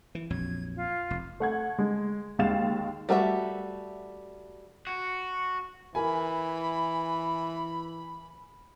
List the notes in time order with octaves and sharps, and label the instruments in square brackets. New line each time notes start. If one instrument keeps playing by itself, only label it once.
[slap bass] E3
[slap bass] A#1 F2 F#3 [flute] G#6
[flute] F4
[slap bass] F1
[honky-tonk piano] A3 F#5 G#6
G#3
D#2 G#3 F5 A6 E7
[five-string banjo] G3 A3 F#4 B4 E5
[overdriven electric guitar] F#4
[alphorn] E3 [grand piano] A#4 G#5 [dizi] B5